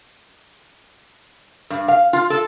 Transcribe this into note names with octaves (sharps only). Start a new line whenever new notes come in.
G2
F5
F4
A4